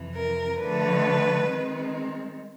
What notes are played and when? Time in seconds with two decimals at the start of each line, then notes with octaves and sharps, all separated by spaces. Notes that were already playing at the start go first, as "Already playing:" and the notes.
Already playing: F2 C3 E3
0.15 A#4
0.58 D3 F3 A3 B4
1.46 D#3 G#3 C4